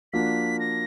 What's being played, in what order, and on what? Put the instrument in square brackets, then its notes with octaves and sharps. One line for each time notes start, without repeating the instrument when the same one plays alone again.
[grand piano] F3 A#3 D4 F#4 [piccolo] B6
[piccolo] A#6